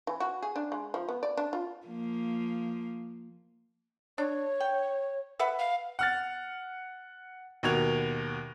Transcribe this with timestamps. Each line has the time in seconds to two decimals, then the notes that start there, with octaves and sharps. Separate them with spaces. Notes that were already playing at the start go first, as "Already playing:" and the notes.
0.07 E3
0.20 F#4
0.43 G#4
0.56 D4
0.72 G#3
0.94 F3
1.09 B3
1.23 D5
1.37 D4
1.53 F4
1.87 F3 A#3
4.18 D4 C#5
4.60 G5
5.39 B4 E5 F#5
5.59 F5
5.99 F#5 F6 A6
7.63 D#2 B2 F#4 A#4 G#6 F7